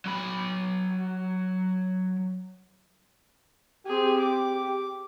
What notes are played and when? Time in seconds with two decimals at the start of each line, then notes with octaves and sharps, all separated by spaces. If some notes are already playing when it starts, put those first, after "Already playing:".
0.06 F#3 B5
3.87 C4 G4 G#4
4.20 D6